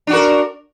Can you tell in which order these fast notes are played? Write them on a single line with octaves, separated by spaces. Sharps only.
D4 F#4 A#4